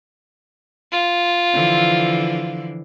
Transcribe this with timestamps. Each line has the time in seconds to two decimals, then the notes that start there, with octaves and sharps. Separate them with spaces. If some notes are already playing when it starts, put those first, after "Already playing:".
0.92 F4
1.54 D3 E3 F3